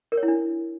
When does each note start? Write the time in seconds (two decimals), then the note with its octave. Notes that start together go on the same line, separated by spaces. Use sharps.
0.12 A#4
0.17 C#5
0.23 E4
0.28 D4